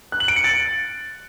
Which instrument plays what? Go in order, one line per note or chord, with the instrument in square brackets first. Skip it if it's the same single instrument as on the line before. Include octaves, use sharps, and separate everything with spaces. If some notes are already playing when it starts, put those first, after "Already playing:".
[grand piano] F#6
F#7
D7
C#7
A6